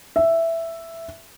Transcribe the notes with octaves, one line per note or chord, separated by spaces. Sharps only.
E5